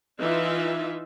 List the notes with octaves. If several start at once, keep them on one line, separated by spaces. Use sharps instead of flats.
E3 D#4 F4 B4 E5